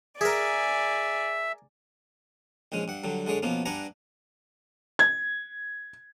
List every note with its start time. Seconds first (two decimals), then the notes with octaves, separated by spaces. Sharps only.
0.21 G#4 A#4 D5 E5 G#5
2.72 A#1 G#2 G#3 C#4
2.88 G2 F#5
3.04 G2 D3 F#3
3.27 D3 G#3 G#4 C#5 D5
3.43 B2 F3 A#3 B3 C#4
3.66 G2 D4 B4 F#5 G#5 A#5
4.99 G#6